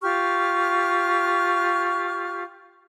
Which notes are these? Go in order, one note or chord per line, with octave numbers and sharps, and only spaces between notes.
F4 G4 C#6 F6